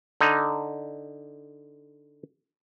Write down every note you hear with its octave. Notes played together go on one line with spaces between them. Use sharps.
D3 D#4